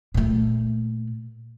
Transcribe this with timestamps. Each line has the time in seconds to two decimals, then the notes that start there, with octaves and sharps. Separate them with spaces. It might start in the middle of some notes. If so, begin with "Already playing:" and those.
0.14 A#2 A3